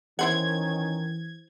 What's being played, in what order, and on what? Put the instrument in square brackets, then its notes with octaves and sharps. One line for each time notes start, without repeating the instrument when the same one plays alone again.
[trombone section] D#3 C#4 [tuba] E3 [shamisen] E4 C5 F#5 [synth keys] G#6